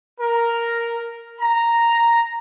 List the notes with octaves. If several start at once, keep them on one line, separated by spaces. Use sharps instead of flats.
A#4
A#5